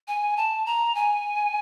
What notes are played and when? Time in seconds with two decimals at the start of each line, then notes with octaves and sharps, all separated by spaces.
0.08 G#5
0.37 A5
0.66 A#5
0.95 G#5